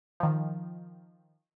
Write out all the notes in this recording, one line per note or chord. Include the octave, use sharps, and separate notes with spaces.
D#3 F3